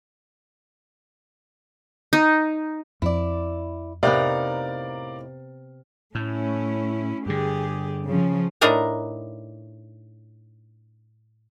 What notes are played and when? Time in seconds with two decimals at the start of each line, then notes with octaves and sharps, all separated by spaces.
2.13 D#4
3.02 F2 F3 E4 D5
4.03 A2 C3 B3 D#4 A#4 D5 F5 A#5
6.15 A2 A3 C#4 E4
7.26 G2 D3 G4 G#4
8.07 C#3 F3 C#4
8.61 A2 D4 D#4 A#4 A#5